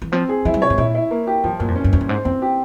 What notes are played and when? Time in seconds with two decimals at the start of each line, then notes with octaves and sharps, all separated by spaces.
0.02 E3
0.12 F3 C4
0.29 G#4
0.45 F3 E4
0.54 G3
0.62 C3 C#5
0.70 G#2
0.78 A#2 E4
0.95 E4
1.11 A#3
1.27 G4
1.44 G2 F3
1.60 G2 A#2
1.68 F2
1.76 C#4
1.84 G2
1.93 F2 C#4
2.01 G2
2.09 G#2 C5
2.25 F2 C4
2.42 G4